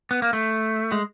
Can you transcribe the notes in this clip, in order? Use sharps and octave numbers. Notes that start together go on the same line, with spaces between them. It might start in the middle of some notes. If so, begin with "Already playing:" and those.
B3
A#3
A3
G#3